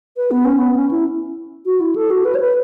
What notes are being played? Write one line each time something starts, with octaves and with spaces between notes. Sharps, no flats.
B4
B3
C#4
B3
C#4
E4
F#4
E4
A4
F#4
B4
C#5
B4